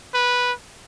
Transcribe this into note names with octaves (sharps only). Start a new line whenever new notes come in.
B4